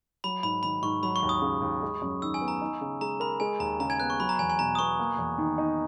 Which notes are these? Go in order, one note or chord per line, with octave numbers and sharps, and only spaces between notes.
F#3 B5
G#2 B5
D#3 B5
G#2 C#6
F#3 B5
C#6
D#2
D#6
C#3
D#2
G#3
F#2
D#3 E6
G#5
B3
A#5
D#4
C#3
G#3 A#5
A#4 B5
G#3 G#5
D#2 A#5
C#3 A#5
G#5 G#6
B3 F#6
C#6
F#3 B5
A#5
E2 G#5
G#5
B2 A#5
D#6
B3 C#6
A#3
E2
D#3
D#4